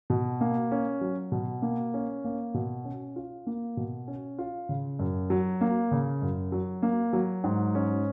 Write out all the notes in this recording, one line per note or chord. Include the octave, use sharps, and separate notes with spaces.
B2
A#3
C#4
F#3
B2
A#3
C#4
A#3
B2
C#4
F4
A#3
B2
C#4
F4
C#3
F#2
F#3
A#3
C#3
F#2
F#3
A#3
F#3
G#2
C#4